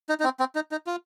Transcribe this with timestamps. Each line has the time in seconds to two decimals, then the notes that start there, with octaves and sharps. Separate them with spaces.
0.09 D#4
0.20 D#4
0.24 C4
0.40 C4
0.55 D#4
0.72 D#4
0.87 F4